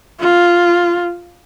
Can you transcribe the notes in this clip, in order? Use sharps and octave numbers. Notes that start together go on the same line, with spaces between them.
F4